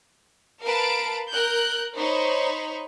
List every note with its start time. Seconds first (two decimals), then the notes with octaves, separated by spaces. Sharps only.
0.63 A#4 B4 F5 A5 D7
1.31 A#4 F#6 G6
1.97 D#4 C5 C#5 B5 C#6